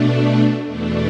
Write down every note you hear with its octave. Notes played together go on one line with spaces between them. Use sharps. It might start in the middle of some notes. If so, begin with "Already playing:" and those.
Already playing: B2 A3 D4
E2 B2 A3 D4